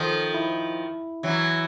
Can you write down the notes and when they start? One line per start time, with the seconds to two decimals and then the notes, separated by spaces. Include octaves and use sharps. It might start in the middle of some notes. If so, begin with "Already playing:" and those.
Already playing: D#3 F3 A4
0.34 E4
1.23 E3 F#3